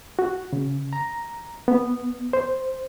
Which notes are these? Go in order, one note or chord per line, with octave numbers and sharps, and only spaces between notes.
F#4
C#3
A#5
B3
C5